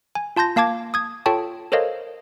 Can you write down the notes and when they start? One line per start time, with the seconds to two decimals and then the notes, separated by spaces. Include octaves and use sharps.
0.15 G#5
0.36 F4 A5 C6 G6 A#6
0.56 A#3 F5 A5 D6 G#6
0.94 D#6 G#6
1.26 F4 A4 C#5 G5 A5 C#6
1.72 A4 A#4 C5 C#5 D#5 F5